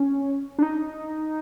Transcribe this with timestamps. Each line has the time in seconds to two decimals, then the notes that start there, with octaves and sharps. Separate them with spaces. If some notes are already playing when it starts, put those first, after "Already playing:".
Already playing: C#4
0.59 D4
0.63 D#4